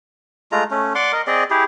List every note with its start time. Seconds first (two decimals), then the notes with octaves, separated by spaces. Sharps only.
0.52 G#3 A3 F4 A#5
0.71 A3 C#4
0.95 D5 F#5 C6 D6
1.13 A#4 D#5
1.27 C4 G#4 D5 D#5
1.50 E4 G4 G#4